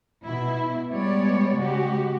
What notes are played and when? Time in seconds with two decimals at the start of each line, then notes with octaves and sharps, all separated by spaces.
0.25 B2 E4
0.90 G3 G#3 B3 C#5 D5
1.57 C#3 G#3 F#4 G4